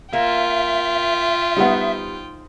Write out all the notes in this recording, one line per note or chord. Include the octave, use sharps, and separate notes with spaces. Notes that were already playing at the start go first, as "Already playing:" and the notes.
A#3 F4 E5 G5
G3 B3 D#4 C5 F#5